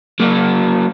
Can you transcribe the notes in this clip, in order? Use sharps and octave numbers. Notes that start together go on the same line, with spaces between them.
F#3 A#3